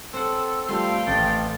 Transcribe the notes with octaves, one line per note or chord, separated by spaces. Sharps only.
C4 A4 F#5 E6
F3 G3 A3 F5 G5 C6
A1 A3 A6